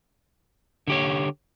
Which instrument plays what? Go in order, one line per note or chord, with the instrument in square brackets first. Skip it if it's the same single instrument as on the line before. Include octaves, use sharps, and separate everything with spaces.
[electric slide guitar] D3 G4 C#5